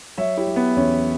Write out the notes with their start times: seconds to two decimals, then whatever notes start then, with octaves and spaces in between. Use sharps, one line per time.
0.18 F#3 C#5 E5
0.37 E4 G4
0.47 F#3
0.56 B3
0.77 E2 C#4